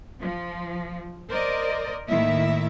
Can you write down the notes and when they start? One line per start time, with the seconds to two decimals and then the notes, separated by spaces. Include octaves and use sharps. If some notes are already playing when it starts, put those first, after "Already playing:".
0.20 F3
1.30 A#4 C5 D5 D#5
2.08 A2 D#3 A#3 E4 E5